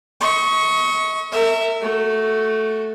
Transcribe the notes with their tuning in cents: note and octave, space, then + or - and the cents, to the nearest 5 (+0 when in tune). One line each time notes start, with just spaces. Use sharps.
D#5 +45 C#6 +0
A#4 -35 E5 +0
A3 +0 F#4 +5